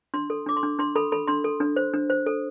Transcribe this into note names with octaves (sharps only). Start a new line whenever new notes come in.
D4 C6
A4
D4 D6
C6
D4
D4 C6
A4 B5
A4 B5
D4 C6
A4
D4
C5
D4
C5
A4